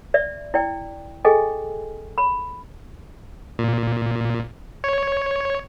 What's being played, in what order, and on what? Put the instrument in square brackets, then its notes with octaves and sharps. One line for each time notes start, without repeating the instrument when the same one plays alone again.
[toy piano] D5 E5
E4 D5 G5
G#4 A4 D#5 G5 G#5
B5
[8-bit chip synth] A#2
C#5